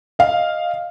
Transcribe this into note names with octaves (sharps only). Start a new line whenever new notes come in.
D#5 F5